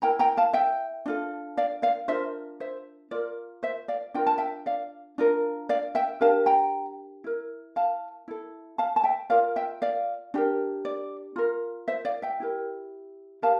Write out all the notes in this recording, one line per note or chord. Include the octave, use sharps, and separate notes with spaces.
E4 A#4 G5 A#5
G5 A#5
F5 A5
E5 G5
D4 F4 A4
D5 F5
D5 F5
D4 F4 A#4 C5 E5
C5 E5
F4 A#4 D5
C5 E5
D5 F5
D4 F4 A#4 G5
A5
E5 G5
D5 F5
D4 F4 A#4
D5 F5
E5 G5
D4 G4 A#4 F5 A5
G5 A#5
E4 A#4
F5 A5
E4 A4
F5 A5
A5
E5 G5
F4 A#4 D5 F5
E5 G5
D5 F5
D4 G4 A#4
D5
F4 A#4
C5 E5
D5 F5
E5 G5
E4 G4 A#4
G4 A#4 F5 A5